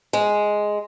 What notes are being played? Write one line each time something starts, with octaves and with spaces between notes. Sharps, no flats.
G#3